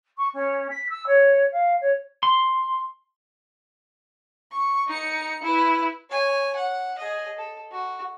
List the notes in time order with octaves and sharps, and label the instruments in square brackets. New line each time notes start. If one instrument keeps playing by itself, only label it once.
[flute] C#6
C#4
B6
E6
C#5
F5
C#5
[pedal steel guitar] C6
[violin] C#6
D#4 C#7
E4 B4
[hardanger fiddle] C#5 G#5
F#5
G#4 D#5
A4
F#4